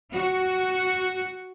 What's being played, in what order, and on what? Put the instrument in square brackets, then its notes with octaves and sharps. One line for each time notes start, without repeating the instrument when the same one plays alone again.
[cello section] F#4